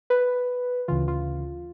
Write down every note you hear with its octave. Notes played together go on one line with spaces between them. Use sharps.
B4
D2 C#3 E3 F4
F4